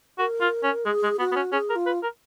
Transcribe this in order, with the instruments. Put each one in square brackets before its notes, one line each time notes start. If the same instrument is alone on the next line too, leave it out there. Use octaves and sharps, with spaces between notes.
[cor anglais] F#4 [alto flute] A#4
[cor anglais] F4
C#4
[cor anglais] G#3 [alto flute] G#4
[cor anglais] G#3
[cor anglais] B3 [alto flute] F#4
[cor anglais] B3
C#4
[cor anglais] C#4 [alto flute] G#4
[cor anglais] A#4
[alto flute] F4
[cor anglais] B4
A#4